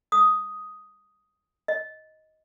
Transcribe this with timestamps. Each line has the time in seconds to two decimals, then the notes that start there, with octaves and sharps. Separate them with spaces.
0.12 D#6
1.68 D#5